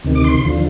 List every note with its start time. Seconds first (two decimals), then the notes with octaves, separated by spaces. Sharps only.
0.04 D2 C3 D#3
0.15 D6
0.25 C6
0.44 D#2 D3 F3